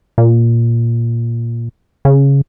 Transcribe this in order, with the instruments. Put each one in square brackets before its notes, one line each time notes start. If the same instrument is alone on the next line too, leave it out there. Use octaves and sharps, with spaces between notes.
[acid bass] A#2
C#3